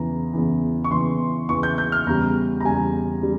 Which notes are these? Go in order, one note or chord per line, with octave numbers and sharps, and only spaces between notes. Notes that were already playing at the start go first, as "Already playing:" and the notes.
Already playing: E2 C#3 E3 A#5
E2 C#3 E3
C#6
E2 C#3 E3 C6
E2 C#3 E3 C#6
G6
G6
F6
E2 C#3 G3 A#5
A#5
E2 C#3 G3 G#5
C#3 G3